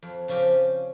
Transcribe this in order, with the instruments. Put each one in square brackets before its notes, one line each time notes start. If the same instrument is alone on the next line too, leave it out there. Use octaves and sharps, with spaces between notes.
[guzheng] F2
C#3 F3 C#4 G4